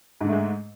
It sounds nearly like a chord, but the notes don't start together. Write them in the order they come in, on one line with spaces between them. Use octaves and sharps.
G#2 D3 A3 G#3